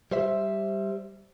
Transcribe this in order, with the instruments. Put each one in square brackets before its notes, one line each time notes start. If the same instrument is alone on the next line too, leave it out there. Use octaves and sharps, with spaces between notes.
[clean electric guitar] G3 C5 E5